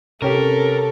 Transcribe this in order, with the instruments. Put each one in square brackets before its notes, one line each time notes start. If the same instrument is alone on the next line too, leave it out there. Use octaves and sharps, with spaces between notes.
[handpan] C3 [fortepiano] C#4 G4 [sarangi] A4 [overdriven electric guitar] A#4